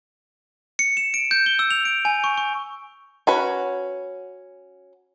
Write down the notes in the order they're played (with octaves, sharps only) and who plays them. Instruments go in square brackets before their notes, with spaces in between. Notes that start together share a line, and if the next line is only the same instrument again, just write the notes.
[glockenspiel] C#7
E7
D7
G6
G7
E6
F7
D7
G#5
C#6
C#6
[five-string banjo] C#4 F#4 B4